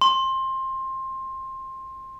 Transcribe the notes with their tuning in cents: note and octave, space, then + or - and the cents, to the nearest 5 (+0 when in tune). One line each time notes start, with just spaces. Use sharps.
C6 +20